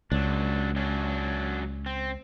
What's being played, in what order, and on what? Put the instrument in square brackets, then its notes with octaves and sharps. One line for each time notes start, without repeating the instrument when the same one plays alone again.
[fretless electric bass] C#2 [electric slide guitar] F#3 D4
[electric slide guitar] F#3 C#4 D4
C4